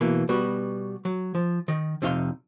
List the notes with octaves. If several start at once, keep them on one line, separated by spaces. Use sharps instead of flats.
B2 E3 A#3
B2 G3 B3 F#4
F#3
F3
D#3 D#5
F2 C3 D#4 F5 C6